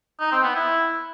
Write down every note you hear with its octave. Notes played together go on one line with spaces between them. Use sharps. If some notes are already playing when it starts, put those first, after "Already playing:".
D#4
C4
B3
E4